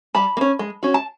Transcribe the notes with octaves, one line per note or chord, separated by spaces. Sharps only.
G3 A5 B5
A#3
C#4
G#3
C#4 F#4
A5